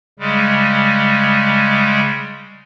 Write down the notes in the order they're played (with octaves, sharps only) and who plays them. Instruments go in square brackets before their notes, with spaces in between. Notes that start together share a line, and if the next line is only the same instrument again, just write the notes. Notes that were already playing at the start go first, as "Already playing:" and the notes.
[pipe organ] C#3 G3 G#3